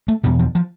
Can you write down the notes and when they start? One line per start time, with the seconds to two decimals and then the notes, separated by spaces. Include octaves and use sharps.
0.08 A3
0.23 E2 B2 G3
0.39 F3
0.55 F3